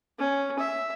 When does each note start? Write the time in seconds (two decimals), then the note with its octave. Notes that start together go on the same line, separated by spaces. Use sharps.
0.19 C#4
0.59 E5